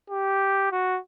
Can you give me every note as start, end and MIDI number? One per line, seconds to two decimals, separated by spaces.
0.10 0.71 67
0.72 0.99 66